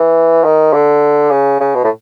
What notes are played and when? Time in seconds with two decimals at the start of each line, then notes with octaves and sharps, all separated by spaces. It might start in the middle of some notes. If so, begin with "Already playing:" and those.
Already playing: E3
0.44 D#3
0.73 D3
1.30 C#3
1.60 C#3
1.74 B2
1.84 A2